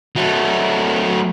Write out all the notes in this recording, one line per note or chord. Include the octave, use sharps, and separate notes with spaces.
F#3 A3